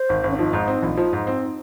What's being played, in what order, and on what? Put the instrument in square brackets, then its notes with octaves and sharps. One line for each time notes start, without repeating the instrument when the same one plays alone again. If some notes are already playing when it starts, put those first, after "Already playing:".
Already playing: [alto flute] C5
[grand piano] G#1
G#1
[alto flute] C#4
[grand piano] F3 [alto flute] D#4
[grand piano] G#2
C4
A#1
F3
G#2
C4